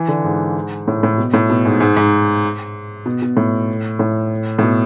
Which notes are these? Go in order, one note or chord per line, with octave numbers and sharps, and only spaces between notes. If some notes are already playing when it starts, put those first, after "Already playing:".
Already playing: E3
D3
G#2
A2
A2
B2
A2
B2
G#2
G#2
G#2
B2
B2
A2
A2
A2
B2